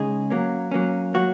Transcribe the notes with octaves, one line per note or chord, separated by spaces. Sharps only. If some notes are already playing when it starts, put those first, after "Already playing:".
Already playing: C#3 G#3 D#4 G#4
F#3 A#3 C#4
F#3 A#3 C#4
F#3 A#3 F#4